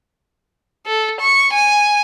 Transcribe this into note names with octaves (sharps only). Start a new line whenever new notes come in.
A4
C#6
G#5